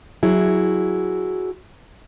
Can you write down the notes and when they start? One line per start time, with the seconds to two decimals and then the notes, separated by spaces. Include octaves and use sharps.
0.23 F#3 E4 G#4